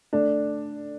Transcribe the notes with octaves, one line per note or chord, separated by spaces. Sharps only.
A3 D4